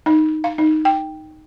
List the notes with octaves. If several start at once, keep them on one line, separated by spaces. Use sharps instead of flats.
D#4
F5
D#4
G5